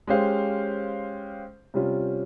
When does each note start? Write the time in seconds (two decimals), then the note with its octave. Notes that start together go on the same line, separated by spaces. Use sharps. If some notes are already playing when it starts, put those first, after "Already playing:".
0.07 G#3 C#4 G4 C5 F5
1.74 C3 G3 C#4 F4